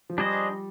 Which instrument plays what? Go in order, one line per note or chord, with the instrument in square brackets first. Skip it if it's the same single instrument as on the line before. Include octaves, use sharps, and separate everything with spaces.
[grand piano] F3
[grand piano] G3 [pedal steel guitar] D4 G#4 C5 D#5